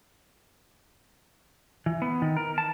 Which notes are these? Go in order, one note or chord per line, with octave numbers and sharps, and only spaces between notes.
E3
B3
D#3
A#4
A5